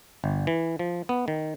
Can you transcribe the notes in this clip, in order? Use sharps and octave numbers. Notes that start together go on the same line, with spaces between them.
G1
E3
F3
B3
D#3